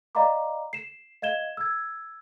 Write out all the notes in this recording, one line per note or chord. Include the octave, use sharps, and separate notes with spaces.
D5 D#5 F5 A#5 B5 D6
C7 E7
D#5 F5 G#6 E7 G7
E6 G#6